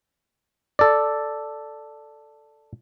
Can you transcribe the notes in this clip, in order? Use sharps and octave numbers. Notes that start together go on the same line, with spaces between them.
A4 D5